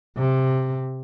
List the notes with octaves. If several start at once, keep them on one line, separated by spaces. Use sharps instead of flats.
C3